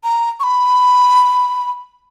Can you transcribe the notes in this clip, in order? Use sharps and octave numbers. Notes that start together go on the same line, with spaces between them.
A#5
C#6
B5